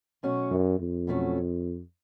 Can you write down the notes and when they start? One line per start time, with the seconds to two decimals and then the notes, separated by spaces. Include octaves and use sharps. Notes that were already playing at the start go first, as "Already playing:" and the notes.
0.23 B2 F#3 A3 C#4 F#4
0.51 F#2
0.80 F2
1.07 B2 F#3 A3 C#4 F#4